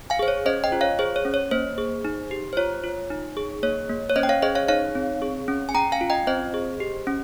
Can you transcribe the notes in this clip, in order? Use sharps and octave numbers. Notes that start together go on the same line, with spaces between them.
F5 G#5
G#4 C5
C#5
C#4 C5 D#5
D#5 G5
F4
C#5 F5
G#4 C5
C#5
C#4
C#5
A#3 C5
G#4
D#4
G4
C5
F4 C#5
F4
D#4
G#4
A#3 C#5
A#3
C#5
C#4 C5 D#5
G5
C#5 F5
G#4 C5 D#5
C#5 F5
D#4 C#5 F5
C4
G#4
C#4
G#5
C#4 G5 A#5
F5 G#5
F4
D#5 G5
C4 C5 D#5
G#4
G4
C#4